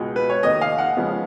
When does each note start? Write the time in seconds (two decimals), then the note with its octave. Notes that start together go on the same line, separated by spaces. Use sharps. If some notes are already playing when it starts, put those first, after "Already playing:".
Already playing: C#2 B2 G#3
0.16 B4
0.30 C#5
0.43 F1 D#2 D#3 D#5
0.61 F5
0.78 F#5
0.96 F2 C#3 F3 G#3 B3